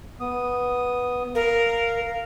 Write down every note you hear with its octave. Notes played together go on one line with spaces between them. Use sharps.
B3 D#6
A#4 F5